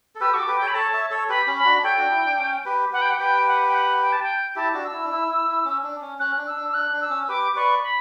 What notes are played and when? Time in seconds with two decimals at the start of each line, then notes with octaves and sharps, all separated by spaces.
0.15 A4
0.20 G4 B4 E6
0.34 F#4 A4 C#6 D6
0.48 G4 B4
0.57 G5
0.62 A4 C#5
0.67 B5
0.74 A4 C#5 A5
0.93 C#5 E5
1.11 A4 C#5
1.29 G4 B4 B5
1.47 C#4
1.57 B5
1.65 D4 F#4
1.84 A4 C#5 G5
1.98 D4 F#4
2.11 E4
2.25 D4
2.38 C#4
2.65 G4 B4
2.93 G4 B4 F#5
3.02 G5
3.11 F#5
3.20 G4 B4 G5
3.47 F#5
3.68 G5
3.74 F#5
4.02 G5
4.13 A5
4.23 G5
4.56 E4 G4 A5
4.74 D4 F#4
4.84 E6
4.93 E4
5.04 D4
5.11 E4
5.28 E4
5.47 E4
5.65 C#4
5.84 D4
6.01 C#4
6.19 C#4 F#6
6.38 D4
6.47 E6
6.57 D4
6.69 E6
6.74 D4 F#6
6.93 D4
7.01 E6
7.10 C#4
7.28 G4 B4 D6
7.56 B4 D5 C#6
7.83 B5